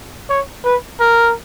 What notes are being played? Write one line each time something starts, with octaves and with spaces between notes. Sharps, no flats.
C#5
B4
A#4